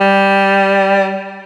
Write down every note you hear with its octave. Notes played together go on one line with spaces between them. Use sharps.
G3